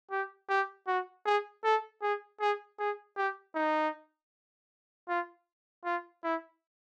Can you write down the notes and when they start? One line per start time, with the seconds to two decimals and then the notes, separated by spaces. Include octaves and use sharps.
0.11 G4
0.50 G4
0.87 F#4
1.26 G#4
1.64 A4
2.02 G#4
2.40 G#4
2.79 G#4
3.17 G4
3.55 D#4
5.09 F4
5.85 F4
6.24 E4